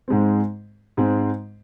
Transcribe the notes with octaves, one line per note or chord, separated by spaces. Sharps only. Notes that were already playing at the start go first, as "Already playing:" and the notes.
G#2 G#3 C4
G#2 G#3 C4